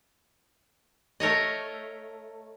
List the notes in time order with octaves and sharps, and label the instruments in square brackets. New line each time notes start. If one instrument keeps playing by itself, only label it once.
[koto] A3 A#4 C#5 D#5